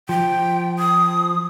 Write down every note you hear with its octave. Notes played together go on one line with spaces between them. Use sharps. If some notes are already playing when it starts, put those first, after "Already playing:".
F3 G5
D#6